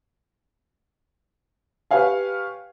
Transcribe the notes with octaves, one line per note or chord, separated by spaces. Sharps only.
G4 B4 C#5 F5 G#5